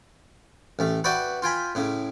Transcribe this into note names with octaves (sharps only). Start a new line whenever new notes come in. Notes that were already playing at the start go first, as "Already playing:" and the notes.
A1 A3
F#4 B4 D5 E5 G5
F4 G5 G#5 B5
A2 C#3